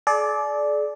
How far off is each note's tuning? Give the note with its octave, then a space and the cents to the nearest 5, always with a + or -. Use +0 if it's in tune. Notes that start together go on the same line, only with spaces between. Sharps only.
G#4 +45 D5 +0